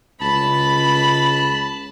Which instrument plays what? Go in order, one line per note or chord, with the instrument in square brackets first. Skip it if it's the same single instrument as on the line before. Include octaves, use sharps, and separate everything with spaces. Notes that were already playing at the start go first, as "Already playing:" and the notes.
[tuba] C#2 [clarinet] A5 [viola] B5